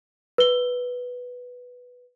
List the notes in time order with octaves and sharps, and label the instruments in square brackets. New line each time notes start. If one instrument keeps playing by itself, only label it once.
[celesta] B4 G7